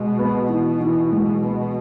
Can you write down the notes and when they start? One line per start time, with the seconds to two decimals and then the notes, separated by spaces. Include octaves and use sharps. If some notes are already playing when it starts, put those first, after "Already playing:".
Already playing: B2 G#3
0.19 B3
0.49 E3
0.81 E3
1.12 G#3
1.44 B3